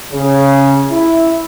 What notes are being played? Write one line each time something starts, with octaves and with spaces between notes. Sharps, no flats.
C#3
E4